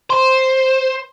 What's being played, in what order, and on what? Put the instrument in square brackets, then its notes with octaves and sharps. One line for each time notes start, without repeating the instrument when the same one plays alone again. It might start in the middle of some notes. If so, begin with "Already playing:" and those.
[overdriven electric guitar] C5